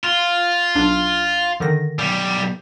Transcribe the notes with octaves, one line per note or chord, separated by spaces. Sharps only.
F4
B1 D4
D3 D#3 A#6
B1 G3